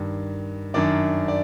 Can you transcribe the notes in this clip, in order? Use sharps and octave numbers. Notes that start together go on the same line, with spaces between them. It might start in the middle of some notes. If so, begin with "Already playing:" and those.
Already playing: G2 D#3
F#2 D#3 D4 D5
D5